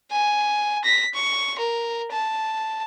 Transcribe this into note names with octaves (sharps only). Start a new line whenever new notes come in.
G#5
A#6 B6
C#6
A#4
A5